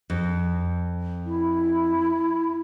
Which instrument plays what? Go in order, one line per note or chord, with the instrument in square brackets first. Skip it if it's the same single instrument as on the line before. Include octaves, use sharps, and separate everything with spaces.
[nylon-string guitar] F2
[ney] E4